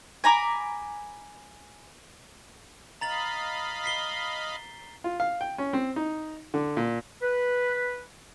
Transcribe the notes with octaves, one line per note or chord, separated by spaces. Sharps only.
G#5 A#5 B5 D6
D#5 F5 A#5 B5 A6 F#7
B6 C7 G7
F4
F5
G5
C#4
C4
D#4
D3
A#2
B4